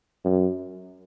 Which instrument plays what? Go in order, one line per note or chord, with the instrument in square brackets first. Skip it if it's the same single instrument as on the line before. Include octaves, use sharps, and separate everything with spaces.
[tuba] F#2